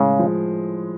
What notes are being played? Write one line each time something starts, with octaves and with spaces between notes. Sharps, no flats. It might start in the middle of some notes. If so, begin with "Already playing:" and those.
Already playing: A2 C#3 G#3
F3